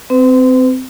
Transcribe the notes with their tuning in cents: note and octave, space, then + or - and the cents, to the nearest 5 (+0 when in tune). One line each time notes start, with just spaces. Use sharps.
C4 -15 B4 +45